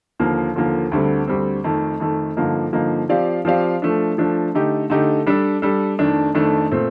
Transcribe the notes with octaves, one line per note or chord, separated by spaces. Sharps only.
D#2 D3 F3 A#3
D#2 D3 F3 A#3
D2 D3 G3 C4
D2 D3 G3 C4
F2 D#3 A3
F2 D#3 A3
G2 D3 F3 A#3 D#4
G2 D3 F3 A#3 D#4
F3 C4 G4 D5 F5
F3 C4 G4 D5 F5
F3 A3 D4
F3 A3 D4
D3 A3 D#4 G4
D3 A3 D#4 G4
G3 D4 A4
G3 D4 A4
F2 D#3 A3 D4
F2 D#3 A3 D4
A#2 A3 C4